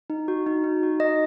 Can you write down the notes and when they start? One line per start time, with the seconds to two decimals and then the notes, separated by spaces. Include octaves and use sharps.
0.10 D#4
0.28 F#4
0.46 D#4
0.64 D#4
0.83 F#4
1.00 D#4 D#5